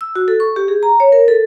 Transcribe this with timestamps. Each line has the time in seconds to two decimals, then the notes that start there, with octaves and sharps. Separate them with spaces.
0.01 E6
0.16 F#4
0.28 A4
0.40 C#6
0.56 G4
0.68 G#4
0.83 A#5
1.00 C#5
1.12 A#4
1.28 A4